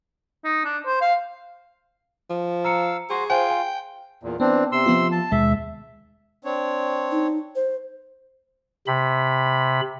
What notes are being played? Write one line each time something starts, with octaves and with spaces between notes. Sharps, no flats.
D#4
D4
C5
F5
F3
F5 A#5 E6 C#7
F#4 G#4 C5
F4 C5 G5 G#5
G#5
E2 A#2
E3 B3 C4 D4
C3 C6 E6
F3 B3 F4
A5
D#2 B2 G#3 E5
C4 D4 C#5
D#4
C5
C3 B5